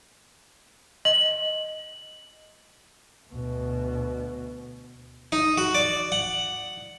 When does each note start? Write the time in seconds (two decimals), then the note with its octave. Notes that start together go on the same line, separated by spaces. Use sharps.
1.05 D#5 F#7
3.30 D2 B2
5.32 D#4
5.58 F#4
5.75 D5
6.12 F#5